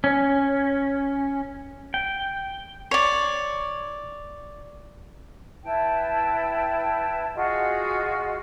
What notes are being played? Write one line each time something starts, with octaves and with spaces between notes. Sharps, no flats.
C#4
G5
C#5 D5
E4 B4 G5 A5
F4 F#4 G#4 D#5